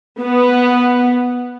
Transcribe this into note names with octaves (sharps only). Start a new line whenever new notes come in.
B3